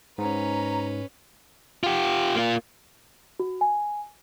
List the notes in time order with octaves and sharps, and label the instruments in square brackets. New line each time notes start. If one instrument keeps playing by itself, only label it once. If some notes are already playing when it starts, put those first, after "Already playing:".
[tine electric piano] G#2 [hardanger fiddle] C#4 B4 [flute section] A#5
[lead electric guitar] F4 G4
A#3 F4
[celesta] F#4
G#5